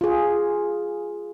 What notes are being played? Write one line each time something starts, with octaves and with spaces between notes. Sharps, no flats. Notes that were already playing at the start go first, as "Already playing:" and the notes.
F4 G#4